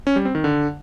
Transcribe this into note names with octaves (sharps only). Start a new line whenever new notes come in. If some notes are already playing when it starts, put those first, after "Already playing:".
C#4
G3
C4
D#3
D3